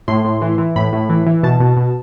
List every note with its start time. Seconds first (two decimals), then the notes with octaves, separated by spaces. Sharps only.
0.08 A2 C6
0.25 A2
0.42 E3
0.58 E3
0.76 A2 B5
0.92 A2
1.10 E3
1.26 E3
1.43 B2 A5
1.60 B2
1.77 B2